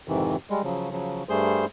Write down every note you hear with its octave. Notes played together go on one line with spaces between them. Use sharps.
F2 G#2 C3 D#3 E3
G3 G#3
C#3 F3 F#3
C#3 F3 F#3
G2 G3 A3 G#4 C5 C6